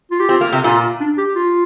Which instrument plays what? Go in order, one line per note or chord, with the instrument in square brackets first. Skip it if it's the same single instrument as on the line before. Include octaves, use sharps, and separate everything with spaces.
[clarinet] F4
G4
[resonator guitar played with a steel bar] C4 [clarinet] F4
[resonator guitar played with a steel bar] A#3
C3
[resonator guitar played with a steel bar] A#2 [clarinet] F4
[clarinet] D4
G4
F4